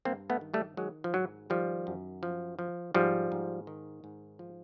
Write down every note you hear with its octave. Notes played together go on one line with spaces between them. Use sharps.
G2 A#3 C4
A3 B3
D#3
G3 A3
D#3 F#3 G#3
F3
G#2 F#3
D#3 F3 G3
F#2
F3
F3
G#2 F3 G3
G#2
D#3
G#2
F3